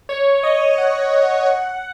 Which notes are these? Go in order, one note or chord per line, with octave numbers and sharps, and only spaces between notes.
C#5
D#5
D#5
F#5
F#5